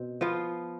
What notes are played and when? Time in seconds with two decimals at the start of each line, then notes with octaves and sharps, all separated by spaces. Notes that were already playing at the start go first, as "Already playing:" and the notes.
Already playing: B2 C4
0.21 F3 B3 F4